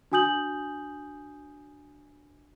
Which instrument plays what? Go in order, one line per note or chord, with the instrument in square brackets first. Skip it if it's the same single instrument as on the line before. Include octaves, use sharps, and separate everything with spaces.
[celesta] D4 F#4 G#5 D#6 G6 F#7